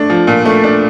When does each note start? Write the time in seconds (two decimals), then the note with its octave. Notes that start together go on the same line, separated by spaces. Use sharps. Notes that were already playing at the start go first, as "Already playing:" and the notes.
Already playing: A3 D4
0.10 F3
0.27 A#2
0.45 A3
0.64 D4